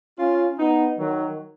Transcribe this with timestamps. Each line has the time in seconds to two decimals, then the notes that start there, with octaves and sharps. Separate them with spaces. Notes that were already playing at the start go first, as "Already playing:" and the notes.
0.19 C#4 F4
0.59 B3 D#4
0.99 D#3 F#3